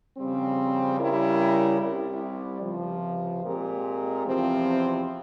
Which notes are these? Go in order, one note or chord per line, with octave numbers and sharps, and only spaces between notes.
F2 C#3 G3 C4
C#3 G3 C#4 E4 A#4
C2 C3 G3
C#2 C3 F3
A#2 G#3 C4 G4 A#4
E2 C3 F3 C4